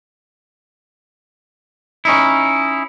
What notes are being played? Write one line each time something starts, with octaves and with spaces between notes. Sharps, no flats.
C#4 D#4 E4